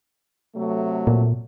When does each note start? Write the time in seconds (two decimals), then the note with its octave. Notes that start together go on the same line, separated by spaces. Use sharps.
0.55 C3 F#3 A3
1.07 A#2